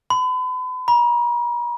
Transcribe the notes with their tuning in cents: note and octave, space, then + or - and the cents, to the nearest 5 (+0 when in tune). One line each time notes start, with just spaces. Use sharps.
B5 +40
A#5 +45